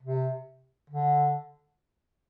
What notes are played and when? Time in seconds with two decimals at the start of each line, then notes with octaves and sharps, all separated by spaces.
0.03 C3
0.90 D3